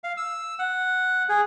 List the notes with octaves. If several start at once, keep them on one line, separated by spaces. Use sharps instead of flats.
F5
E6
F#5
G#4